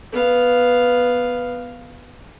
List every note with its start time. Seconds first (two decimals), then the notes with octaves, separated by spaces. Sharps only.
0.13 B3 F5